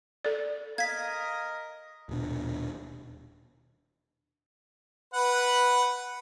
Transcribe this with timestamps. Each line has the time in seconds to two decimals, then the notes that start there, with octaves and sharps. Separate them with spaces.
0.25 A4 D5
0.78 A#4 D#5 F5 G#6 B6
2.09 D#1 B2 D4
5.14 B4 F#5